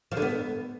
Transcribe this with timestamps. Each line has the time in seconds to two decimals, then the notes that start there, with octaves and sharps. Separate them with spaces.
0.12 F3
0.17 D3
0.22 B3